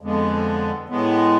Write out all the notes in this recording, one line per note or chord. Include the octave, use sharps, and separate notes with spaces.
F2 D3 G#3 B3
A2 G#3 B3